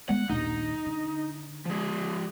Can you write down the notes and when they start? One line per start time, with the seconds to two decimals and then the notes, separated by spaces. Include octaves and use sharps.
0.09 G#3 B3 F#5
0.29 A#1 D#2 D#4
0.86 D3
1.65 F3 G#3